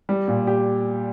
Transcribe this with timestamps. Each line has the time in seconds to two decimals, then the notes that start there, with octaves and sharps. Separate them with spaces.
0.09 G3
0.28 A#2
0.47 G4